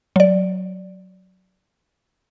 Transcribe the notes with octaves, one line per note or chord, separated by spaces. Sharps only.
F#3 D5